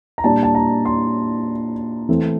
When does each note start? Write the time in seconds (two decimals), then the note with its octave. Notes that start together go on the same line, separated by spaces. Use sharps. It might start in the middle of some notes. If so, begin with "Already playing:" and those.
0.18 A#5
0.24 A#2 G3 D4 A5
0.43 A5
0.55 A#5
0.85 C6
2.09 E3 A3 C4